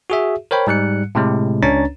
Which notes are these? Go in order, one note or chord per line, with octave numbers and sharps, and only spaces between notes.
F#4 G#4 E5
A#4 C5 C#5 G5 B5
G#2 G3 F#6 C#7
A2 C3 G#3
C#2 C#4 D4 C#5 A#5 A6